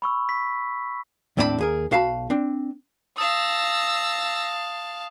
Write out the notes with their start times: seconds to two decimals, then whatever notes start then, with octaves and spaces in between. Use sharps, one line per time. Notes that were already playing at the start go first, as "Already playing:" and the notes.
0.02 B5 C#6 E6
0.29 B6
1.37 D#2 A2 C4 D4 F4 B5
1.58 D#2 G#4 A#4
1.91 B1 F#4 F5 A5 B5
2.30 C4 D4
3.18 F5 A5 D#6 E6 A#6